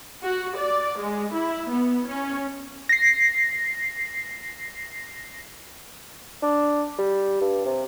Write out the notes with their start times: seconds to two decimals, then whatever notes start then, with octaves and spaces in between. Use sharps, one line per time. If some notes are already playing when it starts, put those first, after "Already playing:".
0.23 F#4
0.57 D5
0.98 G#3
1.32 E4
1.70 B3
2.06 C#4
2.89 A#6 C7
6.42 D4
6.98 G3
7.41 G2
7.65 C3